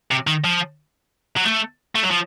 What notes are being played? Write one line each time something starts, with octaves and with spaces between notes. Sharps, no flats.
C3
D#3
F3
F#3
A3
A3
F#3
F3